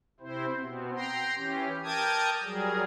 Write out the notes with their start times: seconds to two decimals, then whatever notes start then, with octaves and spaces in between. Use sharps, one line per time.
0.20 C3 C4 E4 C5
0.60 B2 B3 C4
0.95 G5 A#5 C6
1.36 E3 C#4 G4
1.84 A#4 G5 A5 D6 D#6 G#6
2.43 F#3 G3 G#4 A#4